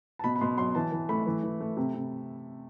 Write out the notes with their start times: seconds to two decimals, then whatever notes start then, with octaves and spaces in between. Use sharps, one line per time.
0.19 A5
0.24 B2 B5
0.36 B5
0.41 B2 C6
0.58 F#3 C6
0.75 E3 A5
0.92 E3
1.09 A3 B5
1.26 E3
1.43 E3
1.60 A3
1.77 C3
1.94 C3